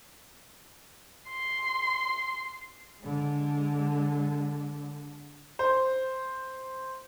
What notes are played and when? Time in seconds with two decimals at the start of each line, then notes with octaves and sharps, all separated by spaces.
1.30 C6
3.02 D3 G#3
5.59 C5